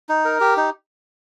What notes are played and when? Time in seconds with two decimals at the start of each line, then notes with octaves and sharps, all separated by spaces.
0.09 D#4
0.25 A#4
0.41 G4
0.57 D#4